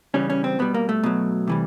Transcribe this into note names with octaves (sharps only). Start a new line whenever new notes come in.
C#3 E3 G3 C#4
C#4
C4
B2 G3 B3
A#3
A3
B2 F#3
C3 E3 G3